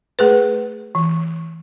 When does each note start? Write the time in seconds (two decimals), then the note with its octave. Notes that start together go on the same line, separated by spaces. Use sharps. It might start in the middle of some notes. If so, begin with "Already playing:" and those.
0.19 A3 G#4 B4
0.95 E3